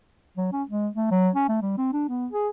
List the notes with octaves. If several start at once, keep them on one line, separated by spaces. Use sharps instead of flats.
F#3
C#4
G#3
A3
F#3
C#4
A3
G3
C4
D4
B3
G#4